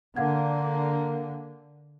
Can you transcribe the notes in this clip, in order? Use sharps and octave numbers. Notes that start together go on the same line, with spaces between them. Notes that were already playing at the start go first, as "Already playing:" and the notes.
D3 A#3 F5 F#5 G#6